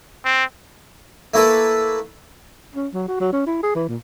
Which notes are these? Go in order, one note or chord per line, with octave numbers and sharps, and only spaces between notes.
C4
A3 A#3 E4 A4 B4
C#4
F#3
F#4
F#3
C#4
E4
G#4
E3
A#2